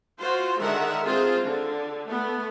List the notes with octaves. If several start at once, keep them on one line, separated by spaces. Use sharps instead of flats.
F4 F#4 C5
D3 D#3 G#3 A#4 E5 F#5
G#3 C4 F4 G#4 C5
D3
A3 B3